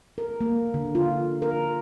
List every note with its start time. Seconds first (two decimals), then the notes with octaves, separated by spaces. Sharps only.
0.18 A#4
0.41 A#3
0.74 D3
0.95 F4
1.42 A#4